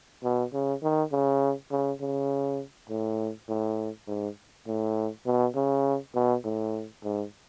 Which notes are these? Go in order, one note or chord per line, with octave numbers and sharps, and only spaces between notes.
B2
C#3
D#3
C#3
C#3
C#3
A2
A2
G#2
A2
B2
C#3
B2
A2
G#2